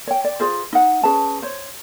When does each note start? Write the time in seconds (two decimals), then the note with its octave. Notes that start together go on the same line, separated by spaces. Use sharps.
0.07 C#5 G5
0.24 D5
0.40 F4 G#4 C5
0.73 D#4 F#5
1.03 C#4 G#4 B4 A5
1.42 C5 C#5